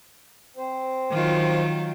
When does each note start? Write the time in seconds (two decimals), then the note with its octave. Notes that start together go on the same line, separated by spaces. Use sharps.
0.57 C4 C5
1.11 D#3 F#3 F4